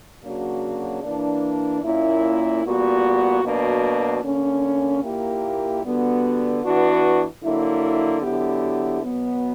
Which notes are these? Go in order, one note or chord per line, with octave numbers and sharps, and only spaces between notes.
C#3 F#3 A#3 D4 F#4
E3 A#3 D4
A#2 A#3 C#4 E4
A#2 G3 B3 F#4
B2 F#3 A#3 D4 F#4
D3 A#3 C#4
A#2 A#3 E4 G4
D3 G3 B3 F#4
E3 B3 D4 F#4
D3 F#3 A#3 E4
D3 F#3 B3 E4 G4
B2 F#3 B3